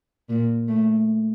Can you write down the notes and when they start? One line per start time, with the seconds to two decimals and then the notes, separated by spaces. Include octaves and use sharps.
0.29 A#2
0.68 A3